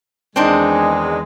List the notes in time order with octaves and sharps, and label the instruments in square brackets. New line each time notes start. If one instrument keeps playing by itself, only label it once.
[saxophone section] E2 D#3 G#3 [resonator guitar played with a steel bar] C4 D4 D#4